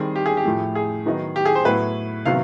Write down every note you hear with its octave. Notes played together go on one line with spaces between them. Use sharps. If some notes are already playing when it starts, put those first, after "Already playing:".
Already playing: D#3 G3 C4 G#4
G4
G#4
G4
A2 F3 A3
G#4
D#3 F#3 B3 D#4
G4
G#4
C5
A2 F#3 B3 E4 B4
C3 D#3 F#3 B3 F5